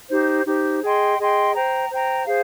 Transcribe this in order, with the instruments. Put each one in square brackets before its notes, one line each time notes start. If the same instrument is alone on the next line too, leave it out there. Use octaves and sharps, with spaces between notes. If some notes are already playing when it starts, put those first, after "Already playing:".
[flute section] D#4 G4 C5
D#4 G4 C5
G#4 D#5 G5 C6
G#4 D#5 G5 C6
C5 G5 A#5
C5 G5 A#5
G#4 C5 F5